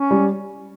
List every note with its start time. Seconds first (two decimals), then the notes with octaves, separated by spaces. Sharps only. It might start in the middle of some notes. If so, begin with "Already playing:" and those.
Already playing: C#4
0.11 G3